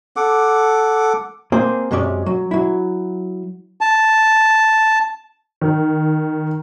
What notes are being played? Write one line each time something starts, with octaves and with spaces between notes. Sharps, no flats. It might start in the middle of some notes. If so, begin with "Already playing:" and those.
A4 F#5 D6
A#3 C4 G#4 C5
F#2 C3 G#3 C#4 D5
F#3
F#3 E4
A5
D#3